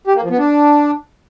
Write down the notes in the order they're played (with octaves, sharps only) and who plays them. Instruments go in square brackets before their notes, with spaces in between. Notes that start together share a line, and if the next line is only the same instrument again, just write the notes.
[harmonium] G4
A#3
F3
B3
D4